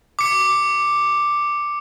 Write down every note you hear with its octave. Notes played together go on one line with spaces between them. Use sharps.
D6 C#7